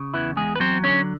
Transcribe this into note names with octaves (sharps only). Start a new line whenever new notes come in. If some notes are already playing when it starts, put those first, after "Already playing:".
Already playing: C#3
E2 E3 E4
E2 G#3 G#4
B4
F#3 C4 C5
D3 C#4 C#5